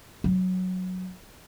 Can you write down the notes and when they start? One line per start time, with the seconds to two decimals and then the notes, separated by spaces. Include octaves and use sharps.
0.24 F#3